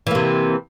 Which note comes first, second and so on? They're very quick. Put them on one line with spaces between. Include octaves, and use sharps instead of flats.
E3 A#3 C3